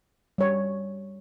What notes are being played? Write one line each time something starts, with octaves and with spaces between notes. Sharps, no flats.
G3 C#5